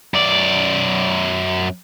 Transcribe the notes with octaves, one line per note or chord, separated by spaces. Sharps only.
F#2 D5